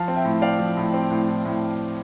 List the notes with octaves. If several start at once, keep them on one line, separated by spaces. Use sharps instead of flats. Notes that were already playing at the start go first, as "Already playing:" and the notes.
Already playing: F3 F5 A5
C4
E5 G5
A2
C4 D5 F5
F3
A2
C4
A2
A2
A2